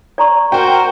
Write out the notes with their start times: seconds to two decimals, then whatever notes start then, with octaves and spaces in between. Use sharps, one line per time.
0.18 D5 A#5 C#6
0.52 F#4 A#4 C5 G5